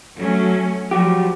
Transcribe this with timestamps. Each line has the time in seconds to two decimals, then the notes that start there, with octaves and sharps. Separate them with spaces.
0.17 F#3 A3 C#4
0.91 F3 F#3 F#4 G4